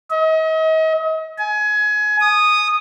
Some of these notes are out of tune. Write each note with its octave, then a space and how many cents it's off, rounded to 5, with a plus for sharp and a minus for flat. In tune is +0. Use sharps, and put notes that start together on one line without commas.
D#5 +40
G#5 +25
D#6 -10